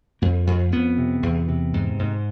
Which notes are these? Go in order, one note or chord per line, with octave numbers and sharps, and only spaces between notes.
F2 A#3
F2
F2 B3
C3
E2
C3
G#2
G#2